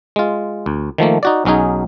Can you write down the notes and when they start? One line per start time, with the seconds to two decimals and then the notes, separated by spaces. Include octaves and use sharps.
0.16 G#3 F4
0.66 D2
0.98 D#3 F3 A3 A#3
1.23 D#4 F#4 D5
1.45 B1 F#3 C#4 D#4 G#4